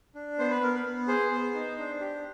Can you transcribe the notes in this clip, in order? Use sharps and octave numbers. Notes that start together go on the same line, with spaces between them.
D4
B3 C5
B4
B3 A#4
B4
B3
G#4 C5
B3
D#4
D4
G4